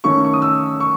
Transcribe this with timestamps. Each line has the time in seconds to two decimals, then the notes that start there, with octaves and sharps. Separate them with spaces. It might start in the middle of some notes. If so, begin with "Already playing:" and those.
0.04 D#3 A3 C#4 C#6
0.24 C#6
0.33 D#6
0.42 E6
0.80 C#6